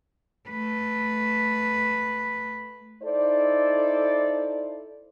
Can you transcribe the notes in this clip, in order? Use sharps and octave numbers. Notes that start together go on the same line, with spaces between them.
A3 B4
D#4 E4 A4 C5 D5